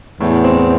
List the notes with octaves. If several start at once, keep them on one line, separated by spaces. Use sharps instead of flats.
E2 A2
C4